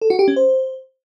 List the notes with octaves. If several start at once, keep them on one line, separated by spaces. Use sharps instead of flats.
A4
F#4
G4
C#4
C5